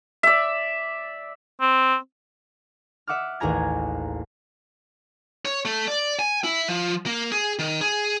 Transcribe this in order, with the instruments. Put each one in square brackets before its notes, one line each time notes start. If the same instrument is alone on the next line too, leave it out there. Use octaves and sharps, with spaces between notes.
[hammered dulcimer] D5 E5
[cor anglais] C4
[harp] E5 F#5 D6 D#6 F6
A1 D#2 G#4 G#5 A#5 G#6
[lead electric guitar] C#5
A3
D5
G#5
E4
F3
A#3
G#4
D#3
G#4